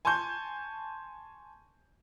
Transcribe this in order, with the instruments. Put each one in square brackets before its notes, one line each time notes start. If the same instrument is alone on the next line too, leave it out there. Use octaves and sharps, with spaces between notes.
[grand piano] G#5 A5 C6 C#6 G6